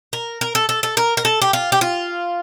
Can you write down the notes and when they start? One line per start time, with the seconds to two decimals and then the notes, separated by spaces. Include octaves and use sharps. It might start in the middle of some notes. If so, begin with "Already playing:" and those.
0.13 A#4
0.41 A#4
0.55 A4
0.69 A4
0.83 A4
0.97 A#4
1.17 A#4
1.25 A4
1.42 G4
1.53 F4
1.72 G4
1.81 F4